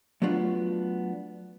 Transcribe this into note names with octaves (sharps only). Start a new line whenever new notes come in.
F#3 A3 B3 D4 F4 F#4